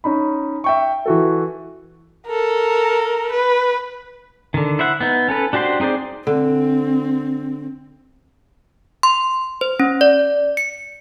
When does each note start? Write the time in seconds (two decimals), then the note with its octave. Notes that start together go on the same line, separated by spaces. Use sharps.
0.04 C#4 D#4 B5
0.64 E5 G5 C#6
1.06 E3 F#4 A4
2.27 A4 A#4
3.31 B4
4.54 D3 D#3
4.79 E4 C5 E5 F#5
5.01 B3 D#4
5.28 C#4 A4 B4
5.53 D4 F#4 G4 C5 C6
5.80 C4 D#4 G#4 C5 D5
6.27 D3 C4
9.03 C6
9.61 C5
9.80 C#4
10.01 D5
10.57 C#7